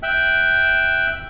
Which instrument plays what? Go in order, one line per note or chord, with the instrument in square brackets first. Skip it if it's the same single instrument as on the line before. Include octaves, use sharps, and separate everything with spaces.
[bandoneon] E5 G5 F#6